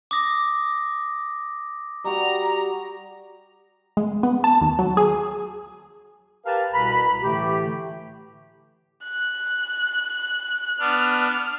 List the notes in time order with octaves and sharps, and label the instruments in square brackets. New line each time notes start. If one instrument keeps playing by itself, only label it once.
[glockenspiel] D6 D#6 A#6
[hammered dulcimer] G3 F#4 [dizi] A#5
[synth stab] G#3
B3
A5
D#2
F#3
G#4
[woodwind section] G4 A#4 B4 F5 A5
C2 B2 B4 A#5 B5
A2 D3 E3 A3 G4
[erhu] F#6
[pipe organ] B3 D4 [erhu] F6